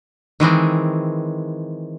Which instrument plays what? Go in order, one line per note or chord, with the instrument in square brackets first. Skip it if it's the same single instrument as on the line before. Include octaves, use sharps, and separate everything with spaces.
[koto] D#3 E3 G#3 C4